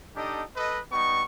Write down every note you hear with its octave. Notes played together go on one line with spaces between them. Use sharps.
D4 D#4 G4 A4 D#5
A4 B4 D#5
G3 B3 D#4 C#6